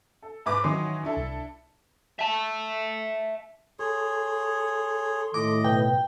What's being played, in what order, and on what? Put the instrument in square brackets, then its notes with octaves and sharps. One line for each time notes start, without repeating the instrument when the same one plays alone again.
[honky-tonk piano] A4
G#2 B4 D6
[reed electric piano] D#3 C6 D#6 [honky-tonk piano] E3 F#3 C#4
[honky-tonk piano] D4 E4 A4
[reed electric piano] C2
[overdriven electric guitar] E5 A5
[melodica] G#4 C#5 [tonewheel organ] A4 C6
[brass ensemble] A2 D#3 [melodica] D#5 [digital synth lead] D6
[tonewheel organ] B2 B4 [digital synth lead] G5